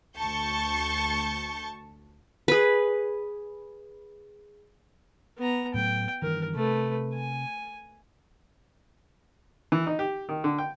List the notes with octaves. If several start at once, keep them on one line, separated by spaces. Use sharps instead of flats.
D2 A5 C#6 G6 C#7
G#4 B4
B3 A#5
A2 F#3 A3 G5
G2 D#3 E3 A#4
C3 A3 B4
G#5
E3
D#4
G4
D#3
D3
G5